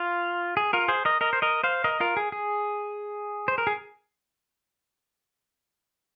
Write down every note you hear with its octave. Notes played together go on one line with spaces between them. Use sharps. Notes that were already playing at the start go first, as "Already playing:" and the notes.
Already playing: F4
G#4
F4 A#4
G#4 C5
A#4 D#5
A#4 D#5
C5
A#4 D#5
C5 F5
A#4 D#5
F4 A#4
G#4
G#4
C5
A#4
G#4